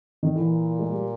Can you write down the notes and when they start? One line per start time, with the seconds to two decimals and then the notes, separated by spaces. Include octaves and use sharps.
0.23 D#3
0.36 A#2 E3
0.79 G#3
0.91 G3